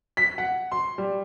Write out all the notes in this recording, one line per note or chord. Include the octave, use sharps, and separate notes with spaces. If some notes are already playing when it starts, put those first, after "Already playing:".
B6
F#5
C6
G3